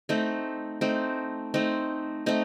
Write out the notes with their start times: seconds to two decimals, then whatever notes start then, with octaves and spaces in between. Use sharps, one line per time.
0.09 A3 C4 D#4
0.81 A3 C4 D#4
1.54 A3 C4 D#4
2.26 A3 C4 D#4